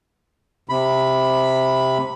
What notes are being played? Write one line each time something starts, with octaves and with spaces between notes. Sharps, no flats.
C3 B5